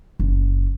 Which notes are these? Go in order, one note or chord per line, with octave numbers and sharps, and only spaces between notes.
F#1